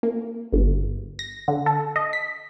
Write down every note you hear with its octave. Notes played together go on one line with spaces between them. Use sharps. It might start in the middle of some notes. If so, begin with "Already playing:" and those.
A#3
G1
A#6
D3
A4
D#5
B6